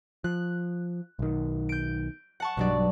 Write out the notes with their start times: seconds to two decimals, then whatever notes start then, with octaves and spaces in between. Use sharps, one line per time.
0.24 F3 F#6
1.19 B1 D#3
1.69 G6 D7
2.40 F#5 A5 C#6
2.57 B1 G2 B2 F#3 D5